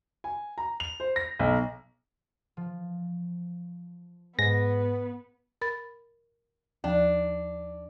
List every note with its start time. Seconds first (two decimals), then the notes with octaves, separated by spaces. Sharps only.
0.24 G#5
0.58 A#5
0.80 F7
1.00 C5
1.16 A#6
1.39 B1
2.57 F3
4.39 G#2 B3 A#6
5.61 A#4 B5 A6
6.84 D#2 F3 D4